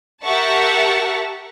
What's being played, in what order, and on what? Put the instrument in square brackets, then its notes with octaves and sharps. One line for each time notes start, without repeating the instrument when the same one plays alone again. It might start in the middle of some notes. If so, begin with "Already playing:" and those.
[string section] G4 A#4 E5 F#5 A5 C#6